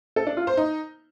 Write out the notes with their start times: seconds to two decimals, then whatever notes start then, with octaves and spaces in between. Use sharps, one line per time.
0.16 A4
0.27 D4
0.37 F4
0.47 C5
0.57 D#4